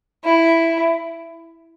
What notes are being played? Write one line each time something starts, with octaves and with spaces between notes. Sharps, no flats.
E4